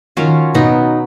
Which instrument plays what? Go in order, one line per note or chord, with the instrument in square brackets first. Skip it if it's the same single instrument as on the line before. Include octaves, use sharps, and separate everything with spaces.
[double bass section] D#3 [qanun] F#3 C#4 F4
[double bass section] B2 [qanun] F#3 B3 D#4